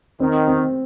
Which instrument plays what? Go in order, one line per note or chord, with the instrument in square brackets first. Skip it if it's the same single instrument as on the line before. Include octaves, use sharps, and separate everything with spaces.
[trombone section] D#3 [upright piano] C4
[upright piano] C4